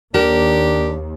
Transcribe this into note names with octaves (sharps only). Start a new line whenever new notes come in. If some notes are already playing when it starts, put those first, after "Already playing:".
D#2 D4 G4 A#4